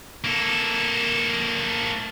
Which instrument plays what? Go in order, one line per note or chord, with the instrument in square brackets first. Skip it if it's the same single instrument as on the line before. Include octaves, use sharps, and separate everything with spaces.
[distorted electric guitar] A#3 A4